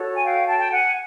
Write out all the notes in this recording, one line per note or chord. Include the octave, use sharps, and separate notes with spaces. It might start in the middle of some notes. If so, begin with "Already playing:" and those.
Already playing: F#4 A4 C#5
G#5
F5 G5
G5 A5
G5
F#5 G#5